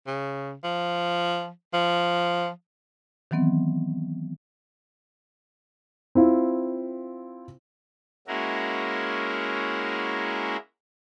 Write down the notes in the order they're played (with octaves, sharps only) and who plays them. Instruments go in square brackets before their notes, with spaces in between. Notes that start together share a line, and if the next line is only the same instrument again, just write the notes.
[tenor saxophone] C#3
F3
F3
[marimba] D#3 E3 F#3 B3 C4
[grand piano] C4 E4 F4
[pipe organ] G#3 A#3 C#4 E4 F#4 A#4